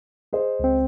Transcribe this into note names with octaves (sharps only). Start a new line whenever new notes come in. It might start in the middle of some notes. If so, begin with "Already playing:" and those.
G#4 C5 D#5
C#2 C4